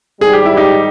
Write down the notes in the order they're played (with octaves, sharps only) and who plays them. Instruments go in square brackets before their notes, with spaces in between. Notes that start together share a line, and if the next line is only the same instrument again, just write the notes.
[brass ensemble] G#2 D#3 G3 [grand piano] G#4
[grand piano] G4
E4
D#4 G4